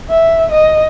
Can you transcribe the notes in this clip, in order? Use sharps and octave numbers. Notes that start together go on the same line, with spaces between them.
E5
D#5